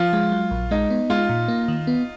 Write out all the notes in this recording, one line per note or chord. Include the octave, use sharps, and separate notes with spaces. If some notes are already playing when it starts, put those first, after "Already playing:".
Already playing: F3 F4
G#3
F#3
A#1
G#3 D#4
B3
G#3 F4
A#2
A#3
D#3
B3